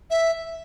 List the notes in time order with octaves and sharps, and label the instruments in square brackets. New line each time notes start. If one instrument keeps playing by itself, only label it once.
[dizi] E5